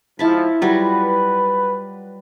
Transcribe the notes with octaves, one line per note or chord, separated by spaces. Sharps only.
G#2 F3 E4 A5 B5
F#3 G3 F4 B4